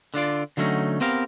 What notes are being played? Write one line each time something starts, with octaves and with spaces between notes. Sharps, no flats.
D3 D4 F4 D5
D3 F#3 A3 C#4 D#4
B3 C4 G4 A#4 F5